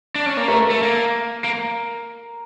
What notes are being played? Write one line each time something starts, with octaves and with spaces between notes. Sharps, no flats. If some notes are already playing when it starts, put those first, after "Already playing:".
D4
C#4
A#3
A3 A#4
A3
A#3
A#3